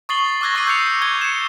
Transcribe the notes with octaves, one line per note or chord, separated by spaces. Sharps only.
C#6 D#6 A6 C7 F#7 G7
D6 E6 F#6 G#6 A#6
C#6 E6 F#6 C7 D#7
G6 C7 C#7 F7
C#6 G6 G#6 G7
C#7 E7